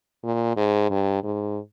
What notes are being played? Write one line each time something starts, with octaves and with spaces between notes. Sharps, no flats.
A#2
G#2
G2
G#2